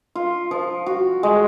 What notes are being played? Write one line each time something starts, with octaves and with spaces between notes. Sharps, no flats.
F4
F3
F#4
G#3